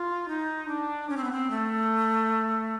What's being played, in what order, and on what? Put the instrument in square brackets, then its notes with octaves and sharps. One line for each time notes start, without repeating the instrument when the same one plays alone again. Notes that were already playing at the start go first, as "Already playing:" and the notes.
Already playing: [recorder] F4
D#4
D4
C#4
C4
B3
C4
A3